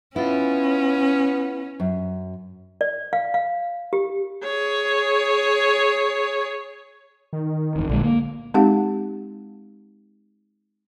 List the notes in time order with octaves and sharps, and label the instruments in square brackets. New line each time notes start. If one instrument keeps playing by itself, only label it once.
[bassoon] B3 [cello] C#4 [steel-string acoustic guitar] E4 F4
[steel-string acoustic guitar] F#2
[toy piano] D5
F5
F5
G4
[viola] G#4 C#5
[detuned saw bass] D#3
[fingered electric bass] G1 E2
[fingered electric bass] A#1 G#3 [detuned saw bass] D3
[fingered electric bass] A#3
[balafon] G#3 C4 D#4 G4 F5 F#5